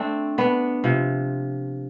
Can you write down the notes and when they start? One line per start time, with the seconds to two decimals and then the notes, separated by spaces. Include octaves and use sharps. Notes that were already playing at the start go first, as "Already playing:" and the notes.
Already playing: A3 C4 D4
0.38 B3 D4
0.84 C3 F3